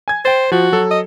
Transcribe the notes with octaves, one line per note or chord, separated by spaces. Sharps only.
G#5 G#6
C5 G5 A6
F3 F#4
F#3 A4
D#5